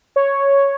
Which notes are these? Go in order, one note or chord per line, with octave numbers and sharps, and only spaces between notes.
C#5